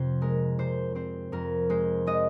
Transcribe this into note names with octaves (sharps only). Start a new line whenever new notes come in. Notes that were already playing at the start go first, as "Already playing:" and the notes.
Already playing: F2 C3 C4 C5
G#3 A#4
C3 C5
C4 C5
F2 A#4
G#3 C5
G#3 D#5